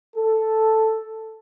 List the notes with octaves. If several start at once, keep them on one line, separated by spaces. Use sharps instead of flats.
A4